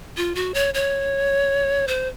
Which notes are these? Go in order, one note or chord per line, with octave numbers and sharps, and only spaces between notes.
F4
F#4
C#5
C#5
C5